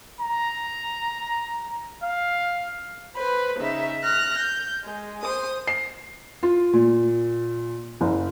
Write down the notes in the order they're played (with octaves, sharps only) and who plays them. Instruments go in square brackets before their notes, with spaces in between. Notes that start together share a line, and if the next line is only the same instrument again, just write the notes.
[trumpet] A#5
F5
[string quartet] B4 C5 B5
C#3 D#4 E5
F6 F#6 A#6
G6
G#3
C5 D#6
[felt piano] C7
F4
A#2
F#1